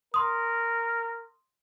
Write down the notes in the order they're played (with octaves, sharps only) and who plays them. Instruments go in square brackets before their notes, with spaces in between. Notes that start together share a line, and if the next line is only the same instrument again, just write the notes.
[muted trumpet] A#4 [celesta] C6 D#6